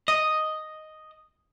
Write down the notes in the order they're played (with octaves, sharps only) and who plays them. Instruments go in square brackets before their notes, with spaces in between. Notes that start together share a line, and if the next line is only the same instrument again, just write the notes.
[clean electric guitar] D#5